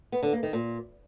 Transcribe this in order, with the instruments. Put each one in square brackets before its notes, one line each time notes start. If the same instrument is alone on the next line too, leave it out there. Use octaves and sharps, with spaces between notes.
[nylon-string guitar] B3
D3
A#3
D#3
A#2